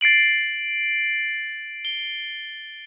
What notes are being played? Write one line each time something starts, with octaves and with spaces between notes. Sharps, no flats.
A6 C7 D7 F#7
G7